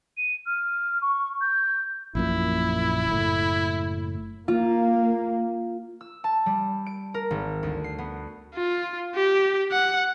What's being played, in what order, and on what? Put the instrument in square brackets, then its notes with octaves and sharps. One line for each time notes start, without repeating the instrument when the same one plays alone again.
[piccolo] D#7
F6
C#6
G6
[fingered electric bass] A#1 F#2 A#2 [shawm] E4
[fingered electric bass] F#1 A2
[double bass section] A#3 [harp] F4
[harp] E6
A5
G3
D7
A#4
G#1
D2
C7
B3
[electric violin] F4
G4
F#5